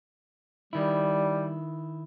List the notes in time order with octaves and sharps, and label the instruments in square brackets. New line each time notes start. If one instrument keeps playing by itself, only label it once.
[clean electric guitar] D#3 E4 [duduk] G3